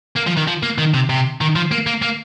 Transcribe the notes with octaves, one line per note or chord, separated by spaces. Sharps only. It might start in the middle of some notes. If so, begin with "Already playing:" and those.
A#3
F3
D#3
F3
A#3
D#3
C3
C3
D#3
F3
A#3
A#3
A#3